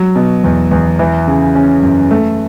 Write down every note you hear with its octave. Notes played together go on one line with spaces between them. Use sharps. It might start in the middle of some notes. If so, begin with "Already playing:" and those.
Already playing: F#3
B2
E2
E2
E3
C#3
C#4
F#2
A3